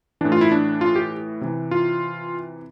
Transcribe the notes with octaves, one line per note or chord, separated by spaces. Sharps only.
A2 E3 D4
F4
E4
D4
F4
G4
C3 E3
F4